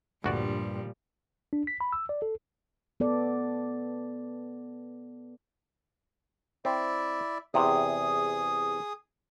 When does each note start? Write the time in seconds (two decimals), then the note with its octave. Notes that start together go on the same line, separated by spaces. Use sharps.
0.24 D2 G2 A#2 F3 G3 F#4 D5
1.53 D4
1.67 B6
1.81 B5
1.92 E6
2.09 D5
2.22 A4
3.00 B3 A4 D5
6.65 C4 E4 D5 E5
7.54 E2 C3 G#4 D#6